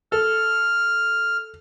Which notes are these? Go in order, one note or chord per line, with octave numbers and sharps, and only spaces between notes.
A4 F6